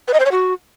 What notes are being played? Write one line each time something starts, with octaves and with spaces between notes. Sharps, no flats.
B4
D#5
C5
C#5
F#4